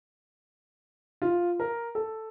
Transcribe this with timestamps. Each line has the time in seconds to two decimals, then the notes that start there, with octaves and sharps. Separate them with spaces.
1.22 F4
1.60 A#4
1.95 A4